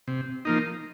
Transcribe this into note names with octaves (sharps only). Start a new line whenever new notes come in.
C3
F3 A#3 D#4